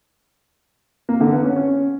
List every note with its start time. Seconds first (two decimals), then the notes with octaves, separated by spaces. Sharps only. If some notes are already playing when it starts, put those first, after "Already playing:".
1.09 A#3
1.21 D3
1.32 B3
1.44 C#4
1.56 C#4